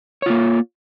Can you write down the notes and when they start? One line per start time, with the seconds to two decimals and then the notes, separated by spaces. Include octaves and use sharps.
0.22 C#5
0.26 F4
0.30 A#3